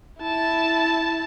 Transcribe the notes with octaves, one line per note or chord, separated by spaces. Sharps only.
E4 A5